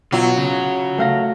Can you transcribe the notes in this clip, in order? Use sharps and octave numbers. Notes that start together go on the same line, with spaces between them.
B2 F#3 F4
C#3
A3 F5 A#6